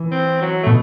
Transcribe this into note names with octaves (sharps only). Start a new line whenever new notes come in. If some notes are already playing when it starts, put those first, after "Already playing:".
Already playing: E3
C4
F#3
B2 A3